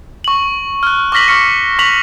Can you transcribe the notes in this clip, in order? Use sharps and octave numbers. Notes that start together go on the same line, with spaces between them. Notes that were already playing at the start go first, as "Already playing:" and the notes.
C#6 F#7
F6 F#6
C#6 D6 F6 A#6 B6 F#7
C#6 F6 C#7
C#6 B6 F7 F#7